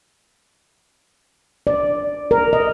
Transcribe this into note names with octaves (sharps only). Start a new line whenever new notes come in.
D5
A#4
D#5